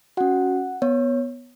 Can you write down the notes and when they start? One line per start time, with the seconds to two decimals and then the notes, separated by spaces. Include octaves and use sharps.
0.17 C#4 F#4 F#5
0.82 B3 C#5